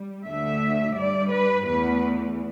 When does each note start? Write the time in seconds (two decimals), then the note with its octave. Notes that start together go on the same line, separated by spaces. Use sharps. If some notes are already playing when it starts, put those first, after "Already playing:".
Already playing: G3
0.26 D2 D3 A3 E5
0.96 G2 G3 D5
1.32 B4
1.67 E2 E3 A3 B4